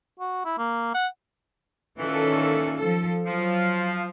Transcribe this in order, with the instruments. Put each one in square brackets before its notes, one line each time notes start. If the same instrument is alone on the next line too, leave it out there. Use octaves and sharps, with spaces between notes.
[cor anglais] F#4
E4
A#3
F#5
[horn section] A#2 E3 [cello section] D#3 C#4 A4
[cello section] F3 A4
[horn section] F3 [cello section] F#3